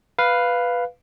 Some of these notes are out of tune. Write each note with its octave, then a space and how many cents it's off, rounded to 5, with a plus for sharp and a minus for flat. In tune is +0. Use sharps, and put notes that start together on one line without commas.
B4 +0 F5 +0